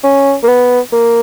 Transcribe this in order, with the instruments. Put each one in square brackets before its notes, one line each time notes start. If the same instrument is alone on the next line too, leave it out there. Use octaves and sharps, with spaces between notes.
[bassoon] C#4
A#3
B3
A#3